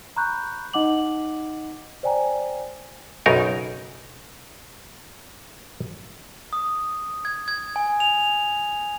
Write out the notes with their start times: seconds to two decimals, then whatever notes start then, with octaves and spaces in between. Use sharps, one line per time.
0.16 A#5 B5 C#6 F#6 G6
0.73 D#4 D#5 F#5 D6 F#7
2.03 C5 D5 G5 G#5 A#5
3.26 B1 F#2 C#3 D#4 A#4
6.53 D#6
7.25 G#6
7.48 G#6
7.76 G#5
8.00 F7